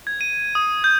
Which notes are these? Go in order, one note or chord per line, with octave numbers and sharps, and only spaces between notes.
G#6
D#7
D#6
G6